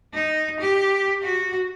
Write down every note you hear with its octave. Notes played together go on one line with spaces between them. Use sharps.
D#4
G4
F#4